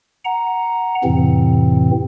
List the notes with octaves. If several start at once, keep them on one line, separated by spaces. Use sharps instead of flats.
F#5 A#5
F2 A2 C3 E3 C4